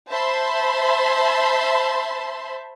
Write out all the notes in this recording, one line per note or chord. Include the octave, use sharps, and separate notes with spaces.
C5 E5 A5 B5 C6